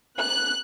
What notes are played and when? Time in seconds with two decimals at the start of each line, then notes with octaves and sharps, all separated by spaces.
0.20 F#6